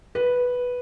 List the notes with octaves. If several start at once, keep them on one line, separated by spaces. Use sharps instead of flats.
B4